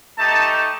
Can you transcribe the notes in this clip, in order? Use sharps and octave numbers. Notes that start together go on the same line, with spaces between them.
A3 D#4 G4 A5